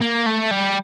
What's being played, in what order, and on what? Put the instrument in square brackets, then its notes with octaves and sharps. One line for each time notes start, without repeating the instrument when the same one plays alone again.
[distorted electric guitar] A#3
A3
G3